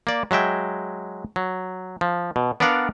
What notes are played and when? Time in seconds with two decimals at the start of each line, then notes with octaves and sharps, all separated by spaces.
0.07 A#3 D5
0.31 F#3 G#3 E5 G5
1.36 F#3
2.01 F3
2.36 B2
2.60 B3 D4 A#4 D5 F5 F#5